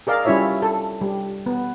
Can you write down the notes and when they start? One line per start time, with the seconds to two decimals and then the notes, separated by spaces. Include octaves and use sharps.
0.07 G#4 A#4 D5 F5
0.25 G3 C#4 E4 F4 C#5 E5
0.62 A4
1.01 G3
1.46 B3